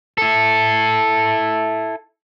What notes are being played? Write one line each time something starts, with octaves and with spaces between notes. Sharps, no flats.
E4 A4